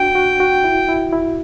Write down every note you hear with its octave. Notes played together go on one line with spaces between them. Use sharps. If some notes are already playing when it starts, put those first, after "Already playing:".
Already playing: D4 F#4 G5
F#4
F#4
E4
E4
E4